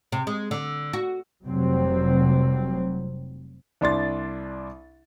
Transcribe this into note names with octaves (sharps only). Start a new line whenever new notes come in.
C3
G#3
D3
F#4
F1 C3 F#3 G3 C4
C2 D4 C6 A6